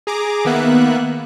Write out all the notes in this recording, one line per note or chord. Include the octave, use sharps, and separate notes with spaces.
G#4 A#5 D6
D#3 A#3 B3 E5 F#6